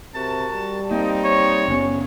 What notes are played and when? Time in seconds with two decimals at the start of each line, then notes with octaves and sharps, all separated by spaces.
0.15 C3 F#4 A#4 A5
0.53 G3
0.91 A#3 C4 D#4
1.25 C#5
1.68 F#1 B3 C#4